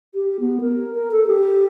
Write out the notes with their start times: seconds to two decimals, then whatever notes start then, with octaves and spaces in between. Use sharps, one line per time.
0.14 G4
0.40 B3
0.60 A#4
0.94 A#4
1.11 A4
1.27 G4